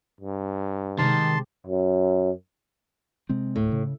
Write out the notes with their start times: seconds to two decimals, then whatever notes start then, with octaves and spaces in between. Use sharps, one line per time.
0.21 G2
0.99 C3 D#3 G#3 A5 C6
1.67 F#2
3.29 C3 G#3 C4
3.56 D1 A2
3.72 C#3